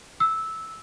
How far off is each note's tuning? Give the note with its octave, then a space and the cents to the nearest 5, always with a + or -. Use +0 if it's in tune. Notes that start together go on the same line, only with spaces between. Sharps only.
E6 -10